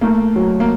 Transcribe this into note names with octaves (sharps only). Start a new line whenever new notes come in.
A3 A#3
F#3
A#3